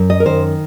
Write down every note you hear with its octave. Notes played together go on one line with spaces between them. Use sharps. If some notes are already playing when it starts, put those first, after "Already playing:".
Already playing: F#2
D#5
A#4
D#3 C5